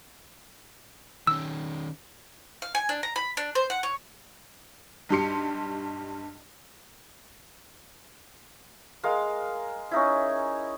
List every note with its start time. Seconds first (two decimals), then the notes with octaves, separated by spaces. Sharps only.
1.27 D#3 C#4 E6
2.62 F5
2.75 G#5
2.89 D4
3.03 A#5
3.16 B5
3.37 D4
3.55 C5
3.70 F#5
3.83 C#5
5.09 B1 G2 G3 G4 C6 C#7
9.03 G#3 A#4 F5
9.91 C#4 D#4 E4